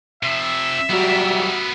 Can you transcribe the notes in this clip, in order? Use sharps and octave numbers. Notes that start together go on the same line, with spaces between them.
C3 F3 E5
F#3 G3 B3 F#4 A#4